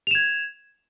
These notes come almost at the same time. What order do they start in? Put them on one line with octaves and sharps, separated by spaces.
F7 E7 G#6